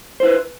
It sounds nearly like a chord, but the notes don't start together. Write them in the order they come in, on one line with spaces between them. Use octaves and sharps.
C5 E4 B4